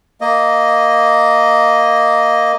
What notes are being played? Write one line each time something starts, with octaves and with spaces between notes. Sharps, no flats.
A#3 D#5